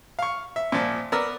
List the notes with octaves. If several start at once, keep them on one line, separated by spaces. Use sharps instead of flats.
F5 C#6
E5
A#2 F3
B3 A#4 D5 E6